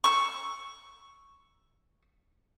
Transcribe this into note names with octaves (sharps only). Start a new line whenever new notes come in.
C#6 E6